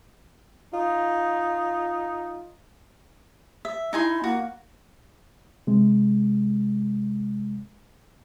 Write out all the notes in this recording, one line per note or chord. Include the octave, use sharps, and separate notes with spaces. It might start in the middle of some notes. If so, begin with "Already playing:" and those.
D#4 F4
E5
D#4 E4 G#5 C6
A#3 F#4
C3 G#3